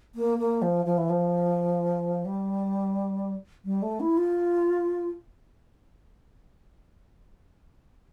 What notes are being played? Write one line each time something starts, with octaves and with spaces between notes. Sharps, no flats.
A#3
A#3
F3
F3
E3
F3
G3
G3
A3
E4
F4